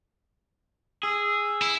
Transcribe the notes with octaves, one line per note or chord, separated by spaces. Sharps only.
G#4 E6
E4